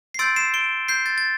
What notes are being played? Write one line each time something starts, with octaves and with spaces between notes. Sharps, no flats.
C7
C6 E6 G6 A6 D7
C7 E7
D7 G7
G6 C7
A6
A6